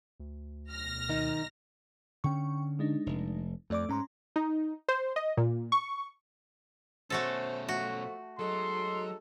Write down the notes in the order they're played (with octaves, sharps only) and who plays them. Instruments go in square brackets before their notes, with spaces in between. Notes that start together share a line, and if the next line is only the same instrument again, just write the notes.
[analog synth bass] D2
[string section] B1 F6 A#6
[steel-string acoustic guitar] D#3 D#4
[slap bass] D3 C#4 [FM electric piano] G5 C#6
[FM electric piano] G#3 D4 D#4
[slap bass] F1
[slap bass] F2 [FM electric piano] A3 D5 D6
[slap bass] G#2 [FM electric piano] C#4 A#5 C6
[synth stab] D#4
C5
D#5
A#2
C#6
[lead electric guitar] B2 C#4 [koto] A3 F#4 A4 [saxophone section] C5
[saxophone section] F3 A3 [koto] F#4
[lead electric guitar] F#3 [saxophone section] G#3 D#4 A4 [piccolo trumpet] C6